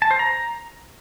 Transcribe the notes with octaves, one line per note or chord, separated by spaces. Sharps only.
A5
C5
A#5